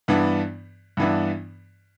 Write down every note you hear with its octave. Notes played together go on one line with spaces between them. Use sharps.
G2 E3 B3 D4
G2 E3 B3 D4